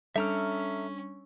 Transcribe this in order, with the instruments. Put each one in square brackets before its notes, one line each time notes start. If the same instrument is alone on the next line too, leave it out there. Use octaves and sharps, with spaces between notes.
[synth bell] G3 D4 [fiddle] C#4 [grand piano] A4 [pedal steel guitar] E5 A#5 F6